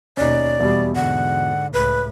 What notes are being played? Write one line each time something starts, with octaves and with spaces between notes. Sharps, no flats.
D#2 B2 C#4 D#4 D5
E2 B2 G3
G#2 D3 F#5
C#2 A2 B4